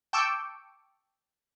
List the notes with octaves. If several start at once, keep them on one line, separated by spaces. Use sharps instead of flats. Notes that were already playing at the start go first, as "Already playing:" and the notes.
G5 A5 C#6 D6 E6 G6